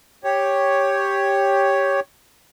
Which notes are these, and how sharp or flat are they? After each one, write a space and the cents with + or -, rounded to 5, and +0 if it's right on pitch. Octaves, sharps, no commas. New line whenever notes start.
G4 +5 C#5 +0